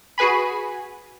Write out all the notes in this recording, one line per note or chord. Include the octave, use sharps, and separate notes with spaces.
F#4 G#4 B4 G#5 B5